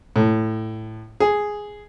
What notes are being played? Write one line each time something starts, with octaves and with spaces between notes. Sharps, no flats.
A2
G#4